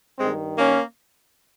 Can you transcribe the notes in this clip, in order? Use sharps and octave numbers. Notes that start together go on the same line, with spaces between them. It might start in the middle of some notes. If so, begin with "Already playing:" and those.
G2 D#3 G#3 C4
A#3 C#4